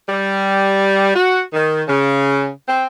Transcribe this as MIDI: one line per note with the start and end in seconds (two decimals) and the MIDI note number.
0.09 1.14 55
1.15 1.42 66
1.53 1.83 51
1.88 2.49 49
2.68 2.86 60